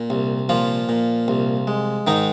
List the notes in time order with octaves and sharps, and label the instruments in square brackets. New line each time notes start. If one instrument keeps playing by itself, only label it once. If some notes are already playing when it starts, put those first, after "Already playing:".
Already playing: [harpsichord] A#2
C2
A#2 F3 F4
A#2
C2
G#3
G#2 D#3 D#4